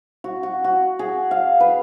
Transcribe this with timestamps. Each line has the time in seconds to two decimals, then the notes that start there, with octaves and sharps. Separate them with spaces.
0.24 F#4
0.43 F#4
0.64 F#4
0.99 G#4
1.31 F5
1.60 B4